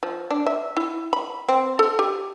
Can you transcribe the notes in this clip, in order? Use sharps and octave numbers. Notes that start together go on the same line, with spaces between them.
F3
D4
E5
E4
B5
C4
A4
G4